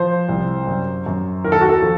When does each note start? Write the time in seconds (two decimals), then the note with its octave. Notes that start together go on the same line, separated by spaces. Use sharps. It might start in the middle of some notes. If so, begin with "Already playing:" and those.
Already playing: F3 C5
0.29 C2
0.67 F#2
1.06 F#2
1.44 D#2 A#4
1.52 A4
1.61 F#4
1.69 A4
1.82 F3